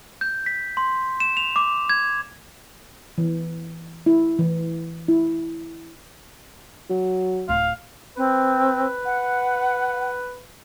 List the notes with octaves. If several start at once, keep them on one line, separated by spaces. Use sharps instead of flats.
G6
B6
C6
E7
F7
D6
G#6
E3
E4
E3
E4
F#3
D1 F5
C4 B4
F#5